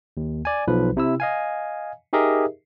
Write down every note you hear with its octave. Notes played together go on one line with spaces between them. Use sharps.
D#2
D5 G#5
B1 F3 B4
C3 E4 E6
D#5 F5 G#5
D#4 G4 G#4 A#4 D#5 E5